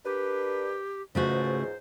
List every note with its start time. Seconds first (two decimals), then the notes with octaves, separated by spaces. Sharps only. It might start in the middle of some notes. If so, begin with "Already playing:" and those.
0.05 D4 G4 A#4 B4
1.15 C#2 G#2 C#3 A3 F#4 C5